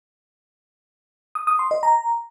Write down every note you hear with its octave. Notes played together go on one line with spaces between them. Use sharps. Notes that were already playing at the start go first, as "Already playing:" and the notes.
D#6
D#6
C6
D#5
A#5